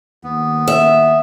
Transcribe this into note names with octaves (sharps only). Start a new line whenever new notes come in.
D#2 B3
E5